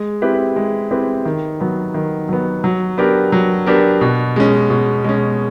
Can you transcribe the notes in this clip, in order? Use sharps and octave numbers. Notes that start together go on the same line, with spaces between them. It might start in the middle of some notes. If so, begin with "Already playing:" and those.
Already playing: G#3
C4 E4 G4 B4
G#3
C4 E4 G4 B4
D#3
F#3 B3
D#3
F#3 B3
F#3
B3 D4 G4 A#4
F#3
B3 D4 G4 A#4
B2
G#3 C#4
B2
G#3 C#4